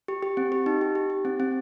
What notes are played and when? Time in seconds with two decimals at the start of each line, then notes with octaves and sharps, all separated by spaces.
0.08 G4
0.23 G4
0.37 C4
0.52 G4
0.66 D#4
0.81 G4
0.95 G4
1.10 G4
1.25 C4
1.40 C4